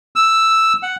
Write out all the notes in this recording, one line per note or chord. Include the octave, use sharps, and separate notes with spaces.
E6
F#5